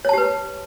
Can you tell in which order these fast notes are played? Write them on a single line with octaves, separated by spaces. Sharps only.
C#5 A5 G4 B4